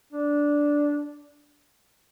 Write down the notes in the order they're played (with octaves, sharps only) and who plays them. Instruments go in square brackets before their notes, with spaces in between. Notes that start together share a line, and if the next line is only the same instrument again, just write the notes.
[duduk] D4